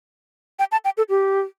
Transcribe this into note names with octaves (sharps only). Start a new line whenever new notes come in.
G5
A5
G5
A4
G4